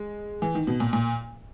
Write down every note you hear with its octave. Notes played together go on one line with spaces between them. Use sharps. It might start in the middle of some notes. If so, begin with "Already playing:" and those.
Already playing: G#3
E3
D#3
B2
A#2
A#2